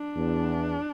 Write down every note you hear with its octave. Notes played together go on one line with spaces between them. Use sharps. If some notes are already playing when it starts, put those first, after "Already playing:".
Already playing: D4
E2